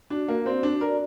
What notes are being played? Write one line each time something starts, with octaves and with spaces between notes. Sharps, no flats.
D4 F#4
A#3
C4 D5
D4
A#4 D5